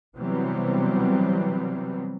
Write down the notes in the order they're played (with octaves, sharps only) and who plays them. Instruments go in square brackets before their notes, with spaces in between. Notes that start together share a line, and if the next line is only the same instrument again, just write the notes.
[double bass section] C3 E3 F#3 G3 B3 C4